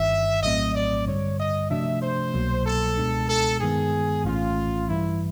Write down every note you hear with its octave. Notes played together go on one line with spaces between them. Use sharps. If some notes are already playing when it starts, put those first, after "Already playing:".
Already playing: G1 G2 D#3 E5
A#1 A2 F#3 A3 C4 D#5
D5
G2 D3 G3 C#5
D#5
C3 F3 A3 D4 F#4 E5
C5
C2 B2 F#3 A#3
A4
C#2 B2 G#3 B3 D4
A4
G2 D#3 G#3 B3 G#4
A#1 A2 E3 A3 C#4 F4
G2 E3 G3 E4